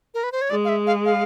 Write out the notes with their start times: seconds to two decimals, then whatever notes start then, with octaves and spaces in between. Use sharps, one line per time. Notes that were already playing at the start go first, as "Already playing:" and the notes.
0.14 A#4
0.23 B4
0.32 C5
0.41 C#5
0.50 G#3 D5
0.65 F5
0.69 E5
0.87 F5
1.05 F5